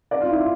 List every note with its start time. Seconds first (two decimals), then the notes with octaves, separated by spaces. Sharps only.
0.11 D5
0.21 F4
0.31 E4
0.39 F4